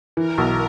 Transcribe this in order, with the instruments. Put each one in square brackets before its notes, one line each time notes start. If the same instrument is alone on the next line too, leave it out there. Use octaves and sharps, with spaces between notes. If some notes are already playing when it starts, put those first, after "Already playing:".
[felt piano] E3 [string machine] A#4
[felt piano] B1